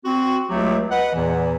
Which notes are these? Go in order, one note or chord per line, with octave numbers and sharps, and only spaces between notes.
C4 F#4
C#2 F#3 A3 G4
B4 D#5 F#5
E2 A#2 E3